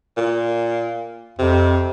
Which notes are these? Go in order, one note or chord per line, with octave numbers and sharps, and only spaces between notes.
A#2
F2 C3